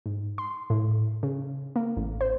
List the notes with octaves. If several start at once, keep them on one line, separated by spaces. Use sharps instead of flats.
G#2
C6
A2
C#3
A#3
A1
C5